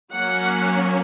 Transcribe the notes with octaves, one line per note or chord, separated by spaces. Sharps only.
F#3 A#3 C#4 F#5